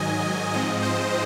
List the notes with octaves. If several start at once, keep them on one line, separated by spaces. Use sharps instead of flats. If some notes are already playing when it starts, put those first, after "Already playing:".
Already playing: G#2 D#3 F#3 D#5 G#5
G#2 F3 G#3 C4 D#5
C5